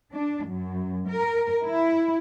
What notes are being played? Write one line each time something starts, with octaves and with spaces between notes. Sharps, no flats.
D4
F#2
A#4
E4